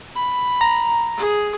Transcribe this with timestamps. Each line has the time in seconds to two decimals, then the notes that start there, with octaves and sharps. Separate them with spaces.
0.15 B5
0.61 A#5
1.18 G#4